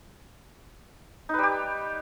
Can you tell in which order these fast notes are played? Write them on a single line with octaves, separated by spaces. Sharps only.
D#4 B4 G3 G4